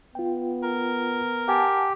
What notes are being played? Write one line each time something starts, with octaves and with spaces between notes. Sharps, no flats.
B3 F4 G5
A#4
G4 F#5 G#5 A5